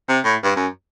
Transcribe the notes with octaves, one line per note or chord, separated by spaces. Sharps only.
C3
A2
G2
F#2